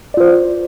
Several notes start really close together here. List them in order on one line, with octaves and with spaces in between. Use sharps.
D5 F4 C5